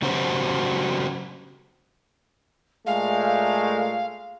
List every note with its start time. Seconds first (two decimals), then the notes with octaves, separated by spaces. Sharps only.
0.02 C#3 F#3 C#4 F#4 G4 C5
2.86 A#2 G#3 A3 F5